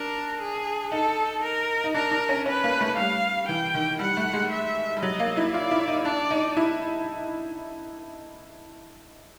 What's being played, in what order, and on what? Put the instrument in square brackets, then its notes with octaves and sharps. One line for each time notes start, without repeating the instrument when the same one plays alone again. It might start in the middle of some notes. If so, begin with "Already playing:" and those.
Already playing: [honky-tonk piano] D4 [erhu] A#4
[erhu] G#4
[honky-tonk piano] D#4 [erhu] A4
[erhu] A#4
[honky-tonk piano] D#4
[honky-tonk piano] D4 [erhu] A#4
[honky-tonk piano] D4
C#4
[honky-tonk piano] C#4 [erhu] B4
[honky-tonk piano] A#3
A3
[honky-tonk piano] G3 [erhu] F5
[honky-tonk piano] E3 [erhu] G5
[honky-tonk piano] D#3
[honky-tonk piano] G3 [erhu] F#5
[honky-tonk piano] A3
G#3
[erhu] E5
[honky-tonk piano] G3
[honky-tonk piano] F#3 [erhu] D#5
[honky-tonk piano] A#3
E4
[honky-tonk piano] F4 [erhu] D5
[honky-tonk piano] E4
D#4
[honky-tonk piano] D4 [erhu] D5
[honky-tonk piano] D#4
E4